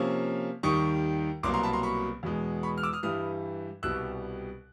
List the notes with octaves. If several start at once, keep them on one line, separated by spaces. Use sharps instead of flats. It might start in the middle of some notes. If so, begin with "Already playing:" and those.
Already playing: C3 F3 A#3 C#4
D#2 D#3 G3 C#6 D#6
C2 B2 F#3 A#3 C6 D6
A#5 C6
A5 B5
A#5 C6
B5 C#6
E2 B2 G#3
B5 C#6
F6
D6 E6
D#6 F6
G2 E3 G3 D#6 F6
C2 B2 G3 E6 F#6